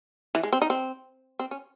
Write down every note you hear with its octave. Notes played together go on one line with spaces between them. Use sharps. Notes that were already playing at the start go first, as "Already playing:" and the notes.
E3
G#3
C4
D#4
C4
C4
C#4